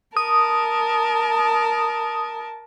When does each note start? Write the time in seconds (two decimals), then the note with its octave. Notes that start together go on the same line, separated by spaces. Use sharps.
0.17 A#4 A5 D#6